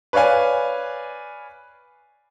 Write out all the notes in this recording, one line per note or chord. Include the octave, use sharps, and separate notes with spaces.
B4 C#5 D5 F5 G#5